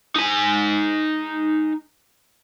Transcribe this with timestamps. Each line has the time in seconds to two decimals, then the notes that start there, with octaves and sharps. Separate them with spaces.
0.16 D#4 G#5